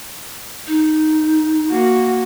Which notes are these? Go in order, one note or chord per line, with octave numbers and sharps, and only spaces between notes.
D#4
A#3 F#4